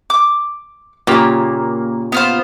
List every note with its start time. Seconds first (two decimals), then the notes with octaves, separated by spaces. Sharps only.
0.10 D6
1.07 A#2 C#3 A#3 G4
2.12 B3 F4 C5